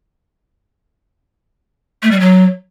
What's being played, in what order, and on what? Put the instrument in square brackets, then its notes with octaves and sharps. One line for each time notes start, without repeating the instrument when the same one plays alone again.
[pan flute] A3
G3
F#3